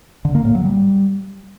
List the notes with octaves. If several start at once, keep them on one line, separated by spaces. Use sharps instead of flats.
D3
A#3
A2
F#3
G3